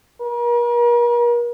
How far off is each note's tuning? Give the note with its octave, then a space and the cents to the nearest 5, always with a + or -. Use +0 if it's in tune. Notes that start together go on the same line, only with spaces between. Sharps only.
A#4 +40